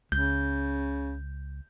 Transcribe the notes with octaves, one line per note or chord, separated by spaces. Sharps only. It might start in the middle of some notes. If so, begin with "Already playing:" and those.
C#2 C#3 G6